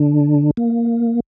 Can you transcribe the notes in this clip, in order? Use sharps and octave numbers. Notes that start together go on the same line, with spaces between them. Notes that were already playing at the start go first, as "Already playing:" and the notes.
Already playing: D3 D4
A#3